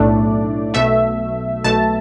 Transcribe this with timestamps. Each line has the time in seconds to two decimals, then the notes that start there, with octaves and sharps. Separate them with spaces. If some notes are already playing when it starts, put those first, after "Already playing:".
Already playing: B1 A2 A3 D4 D5
0.74 B1 B2 A3 E5
1.64 B1 B2 A3 A5